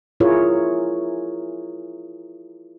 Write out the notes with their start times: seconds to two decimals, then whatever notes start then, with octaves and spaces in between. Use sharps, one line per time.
0.20 E4 F4 G#4 A#4 C#5